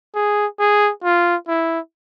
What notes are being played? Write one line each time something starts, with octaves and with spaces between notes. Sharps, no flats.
G#4
G#4
F4
E4